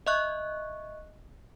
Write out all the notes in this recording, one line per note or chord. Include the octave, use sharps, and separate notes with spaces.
D#5 E5 C#6 F#6